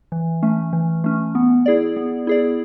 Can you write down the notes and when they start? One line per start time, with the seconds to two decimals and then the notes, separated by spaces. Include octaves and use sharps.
0.12 E3
0.43 A3 C#4
0.73 E3
1.04 A3 C#4
1.35 B3
1.66 E4 G#4 D5
1.96 B3
2.27 E4 G#4 D5